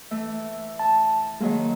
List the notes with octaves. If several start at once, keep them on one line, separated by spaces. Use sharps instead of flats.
E3 A3
A5
D#3 F#3 G#3 A#3